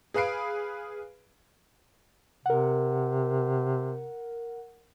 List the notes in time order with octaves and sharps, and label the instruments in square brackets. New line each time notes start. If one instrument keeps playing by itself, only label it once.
[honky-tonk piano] G#4 B4 F5 B5 C7 D7
[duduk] C3 [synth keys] A#4 F#5